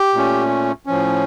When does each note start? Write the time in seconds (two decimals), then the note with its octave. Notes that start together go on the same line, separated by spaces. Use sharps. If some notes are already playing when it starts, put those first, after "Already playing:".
Already playing: G4
0.13 A#2 A3 C#4
0.86 A2 F3 C#4